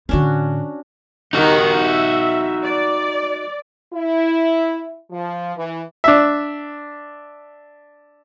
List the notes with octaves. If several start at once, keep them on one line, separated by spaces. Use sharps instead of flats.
A2 D3 C#4 D4 F#4
D#3 D#4 F#4 G4 F#5
E5
D5
E4
F3
E3
D4 E5